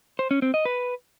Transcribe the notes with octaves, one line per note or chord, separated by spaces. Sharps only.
C5
C#4
C4
D#5
B4